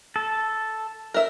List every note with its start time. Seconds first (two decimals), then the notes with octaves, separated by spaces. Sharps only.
0.16 A4
1.14 A#4 E5